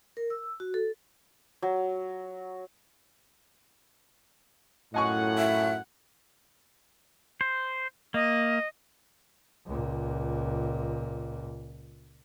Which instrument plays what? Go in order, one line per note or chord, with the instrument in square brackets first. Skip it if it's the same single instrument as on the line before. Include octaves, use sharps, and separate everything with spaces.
[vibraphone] A#4
E6
F#4
A4
[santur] F#3
[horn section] F#2 F4 F#5 [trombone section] A2 [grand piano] D#5 G#5 C#6
[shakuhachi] E5
[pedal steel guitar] C5
[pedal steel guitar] A#3 [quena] D#5
[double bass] C#2 A#2